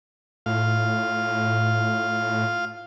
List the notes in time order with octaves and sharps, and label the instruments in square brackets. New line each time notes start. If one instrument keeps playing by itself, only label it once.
[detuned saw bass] A2 [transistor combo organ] F4 F5